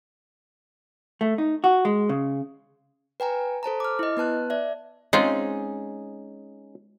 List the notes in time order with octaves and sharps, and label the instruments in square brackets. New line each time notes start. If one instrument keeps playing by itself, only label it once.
[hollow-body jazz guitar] A3
D#4
F#4
G#3
C#3
[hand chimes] B4 G5 G#5 A#5
A4 C5 A5 A#5
D6 F6
E4 D#5
B3 B4 A5 F#6
D5 E5
[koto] G#3 C4 F4 [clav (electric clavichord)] C#4 D#4 G#4